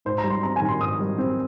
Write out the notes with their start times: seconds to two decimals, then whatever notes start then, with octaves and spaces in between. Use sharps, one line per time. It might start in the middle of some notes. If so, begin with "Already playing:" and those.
0.05 G#2 C5
0.18 A#5
0.24 G3
0.30 C6
0.43 C4 A#5
0.56 G#5
0.62 D#3
0.69 C6
0.81 G#2 D#6
1.00 G3
1.18 C4